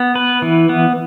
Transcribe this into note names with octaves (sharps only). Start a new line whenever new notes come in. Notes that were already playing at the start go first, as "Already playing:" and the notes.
Already playing: B3
B4
E3
B3